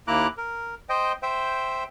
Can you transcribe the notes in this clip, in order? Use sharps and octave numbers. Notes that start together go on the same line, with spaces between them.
D#2 A#3 E4 A#5 D6 F#6
A#4
C5 D#5 G5
C5 E5 G5